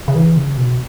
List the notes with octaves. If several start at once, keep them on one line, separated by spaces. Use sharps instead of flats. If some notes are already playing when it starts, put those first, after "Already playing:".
C#3
E3
C#3
B2